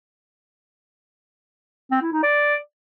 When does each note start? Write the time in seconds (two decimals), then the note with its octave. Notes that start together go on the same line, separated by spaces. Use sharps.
1.91 C4
2.02 E4
2.12 D#4
2.23 D5